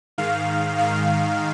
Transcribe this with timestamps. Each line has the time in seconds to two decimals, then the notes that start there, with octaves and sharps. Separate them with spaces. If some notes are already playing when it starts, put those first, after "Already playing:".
0.18 G#2 D#3 F5
0.78 G#2 D#3 F5